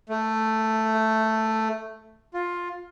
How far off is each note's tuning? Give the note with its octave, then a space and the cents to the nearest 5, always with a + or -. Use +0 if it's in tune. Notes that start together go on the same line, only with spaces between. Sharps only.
A3 +5
F4 +10